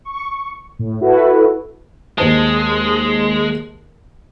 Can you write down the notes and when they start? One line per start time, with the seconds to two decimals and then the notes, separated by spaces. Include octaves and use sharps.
0.05 C#6
0.79 A2
1.01 E4 F#4 A4 B4
2.18 D#2 G#3 C5 A5